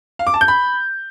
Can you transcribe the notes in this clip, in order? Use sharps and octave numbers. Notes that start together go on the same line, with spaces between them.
F5
D6
A5
G6
B5